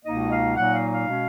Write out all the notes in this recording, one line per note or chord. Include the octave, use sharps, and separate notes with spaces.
C#2 B2 A#3 D#4 D#5
F5
A#2 F#3 A#3 D#4 F#5
F5
F5
B2 G#3 C#4